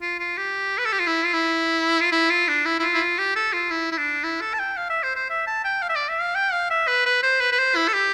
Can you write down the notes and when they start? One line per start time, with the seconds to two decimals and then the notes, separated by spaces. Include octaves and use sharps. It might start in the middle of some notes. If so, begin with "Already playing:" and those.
0.02 F4
0.19 F4
0.37 G4
0.78 B4
0.85 A4
0.92 G4
0.99 F4
1.07 E4
1.25 F4
1.34 E4
2.01 F4
2.12 E4
2.30 F4
2.48 D4
2.66 E4
2.79 E4
2.83 F4
2.94 E4
3.01 F4
3.19 G4
3.36 A4
3.53 F4
3.71 E4
3.92 E4
3.98 D4
4.24 E4
4.41 A4
4.54 A5
4.60 G5
4.77 F5
4.90 E5
5.03 C5
5.16 C5
5.30 E5
5.47 A5
5.65 G5
5.82 F5
5.89 E5
5.96 D5
6.09 E5
6.22 F5
6.35 G5
6.53 F5
6.71 E5
6.88 B4
7.06 B4
7.23 C5
7.41 B4
7.52 B4
7.59 C5
7.76 E4
7.88 A4
7.93 G4